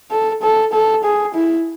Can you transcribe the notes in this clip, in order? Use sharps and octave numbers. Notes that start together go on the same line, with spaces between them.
A4
A4
A4
G#4
E4